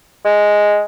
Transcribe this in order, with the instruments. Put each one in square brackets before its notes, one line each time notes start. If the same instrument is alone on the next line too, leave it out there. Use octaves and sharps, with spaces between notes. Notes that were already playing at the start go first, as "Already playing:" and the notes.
[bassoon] G#3